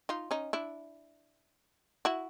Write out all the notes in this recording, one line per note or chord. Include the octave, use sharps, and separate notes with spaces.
D#4 F4
C#4 D#4
D4 E4
E4 F#4